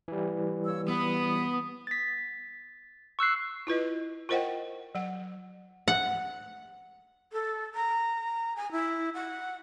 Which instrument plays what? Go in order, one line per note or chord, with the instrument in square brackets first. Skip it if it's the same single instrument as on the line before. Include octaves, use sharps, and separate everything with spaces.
[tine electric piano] E3 G3
[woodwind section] A#3 C#5 E6
[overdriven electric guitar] B3 [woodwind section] B5 D#6
[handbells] A6 B6
C#6 E6 F#6 C7
[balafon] E4 F4 B4 D#5
F4 A#4 C5 D#5 F#5 G5
F#3 F#5
[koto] F#5
[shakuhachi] A4
A#5
G#5
E4
F#5